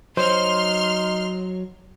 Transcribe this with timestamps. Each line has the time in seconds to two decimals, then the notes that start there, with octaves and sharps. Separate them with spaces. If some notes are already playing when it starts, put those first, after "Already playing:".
0.17 F#3 D#4 C5 C#5 C6 F6